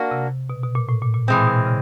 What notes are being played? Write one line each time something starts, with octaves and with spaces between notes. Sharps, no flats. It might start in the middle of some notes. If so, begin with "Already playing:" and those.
Already playing: A#3 D4 F#4
C3
B2
B2
A#2
A2
A#2
A#2
B2 E3 G#3 C4
A#2
B2
C#3